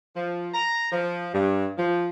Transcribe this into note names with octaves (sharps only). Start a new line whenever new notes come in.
F3
A#5
F3
G2
F3